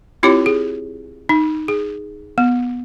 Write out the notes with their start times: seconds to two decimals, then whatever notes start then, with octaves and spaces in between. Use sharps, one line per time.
0.23 C4 E4 F4 G4 C#5
0.46 G#4
1.29 D#4
1.68 G#4
2.38 B3